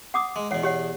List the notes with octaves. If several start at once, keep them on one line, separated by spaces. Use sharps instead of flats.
F#5 D6 D#6
G#3
E2 B2 C#5 F#5
G4 C#5 F#5